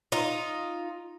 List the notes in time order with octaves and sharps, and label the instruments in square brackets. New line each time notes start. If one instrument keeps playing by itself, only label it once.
[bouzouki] D#4 F4